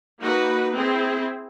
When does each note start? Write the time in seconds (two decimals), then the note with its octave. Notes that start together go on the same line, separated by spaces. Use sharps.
0.19 A#3 D#4 F#4 B4
0.76 C4 E4 G#4